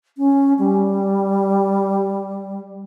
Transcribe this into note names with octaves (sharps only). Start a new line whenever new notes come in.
C#4
G3